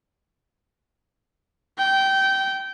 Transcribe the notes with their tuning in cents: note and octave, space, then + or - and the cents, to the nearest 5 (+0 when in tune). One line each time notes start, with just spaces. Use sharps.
G5 -20